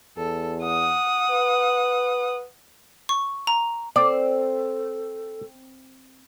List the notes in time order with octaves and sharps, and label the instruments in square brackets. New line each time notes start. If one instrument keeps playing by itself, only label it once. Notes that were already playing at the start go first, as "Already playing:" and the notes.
[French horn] E2 [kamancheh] A4
[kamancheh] F#5 D#6
[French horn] B4
[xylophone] C#6
A#5
[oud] C4 [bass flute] A4 [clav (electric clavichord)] D5